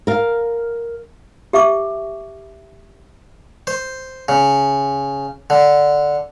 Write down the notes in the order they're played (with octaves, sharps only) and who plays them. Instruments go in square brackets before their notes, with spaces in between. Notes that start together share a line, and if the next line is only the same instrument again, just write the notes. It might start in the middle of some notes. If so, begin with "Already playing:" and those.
[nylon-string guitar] A#4 F5
[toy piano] G4 E5 C#6 D6
[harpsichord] C5
C#3
D3